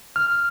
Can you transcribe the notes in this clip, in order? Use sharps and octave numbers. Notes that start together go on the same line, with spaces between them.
F6